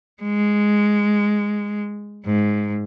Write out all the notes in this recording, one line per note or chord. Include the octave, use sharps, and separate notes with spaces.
G#3
G#2